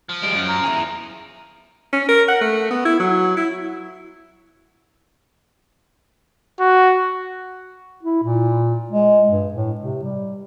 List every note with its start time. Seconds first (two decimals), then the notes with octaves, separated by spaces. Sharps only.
0.09 F3
0.23 G3 G#3 D7
0.35 F#2
0.48 A#5
0.64 E4 G#4
1.93 C#4
2.09 A#4
2.28 F#5
2.41 A3
2.71 B3
2.85 E4
2.99 F#3
3.37 E4
6.60 F#4
8.03 E4
8.23 A#2
8.91 G#3
9.29 G2
9.54 A2
9.80 C3
10.03 G3